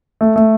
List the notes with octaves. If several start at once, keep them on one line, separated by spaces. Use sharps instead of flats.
A3
A3